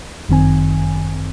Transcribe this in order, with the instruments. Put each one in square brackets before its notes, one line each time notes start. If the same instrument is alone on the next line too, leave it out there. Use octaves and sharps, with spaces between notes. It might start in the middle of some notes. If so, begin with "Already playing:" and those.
[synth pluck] G1 F#2 D#3 C4 G#5